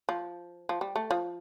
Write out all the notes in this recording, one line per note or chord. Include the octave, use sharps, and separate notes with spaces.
F3
F3
G3
A3
F3